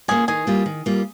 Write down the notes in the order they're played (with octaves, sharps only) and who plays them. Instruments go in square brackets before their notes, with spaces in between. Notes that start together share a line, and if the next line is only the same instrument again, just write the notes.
[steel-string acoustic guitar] A#3 C#4 F4 [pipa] G#4
[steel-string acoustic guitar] D#3 [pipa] G#4
[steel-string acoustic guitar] G3 A#3 F4
D#3
G3 A#3 F4